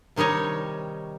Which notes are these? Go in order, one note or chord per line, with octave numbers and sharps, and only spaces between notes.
C3 D#3 G3 D#4 C#5